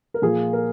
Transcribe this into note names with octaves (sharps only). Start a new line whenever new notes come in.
A#4
A#2 F3 G#4
A#4